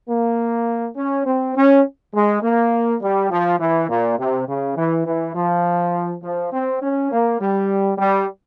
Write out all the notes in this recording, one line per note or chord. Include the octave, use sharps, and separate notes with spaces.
A#3
C#4
C4
C#4
G#3
A#3
G3
F3
E3
A#2
C3
C#3
E3
E3
F3
F3
C4
C#4
A#3
G3
G3